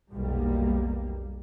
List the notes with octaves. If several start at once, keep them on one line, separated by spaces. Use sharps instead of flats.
F1 B1 G3 A#3